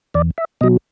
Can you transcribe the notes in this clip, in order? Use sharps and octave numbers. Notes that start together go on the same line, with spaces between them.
E2 D5
E5
B2 F#3 D#5